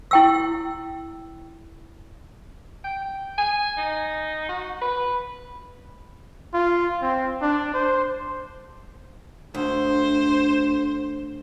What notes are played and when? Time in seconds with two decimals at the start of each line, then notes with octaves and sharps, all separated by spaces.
0.11 E4 G5 E6
2.84 G5
3.38 G#5
3.77 D#4
4.49 F#4
4.81 B4
6.54 F4
7.02 C4
7.42 D4
7.74 C5
9.55 D2 C5